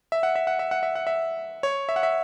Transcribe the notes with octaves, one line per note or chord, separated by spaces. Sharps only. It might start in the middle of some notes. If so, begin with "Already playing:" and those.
E5
F#5
E5
F#5
E5
F#5
E5
F#5
E5
C#5
E5
F#5
E5